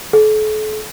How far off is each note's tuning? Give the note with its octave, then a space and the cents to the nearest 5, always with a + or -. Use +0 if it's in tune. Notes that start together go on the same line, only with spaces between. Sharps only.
A4 -40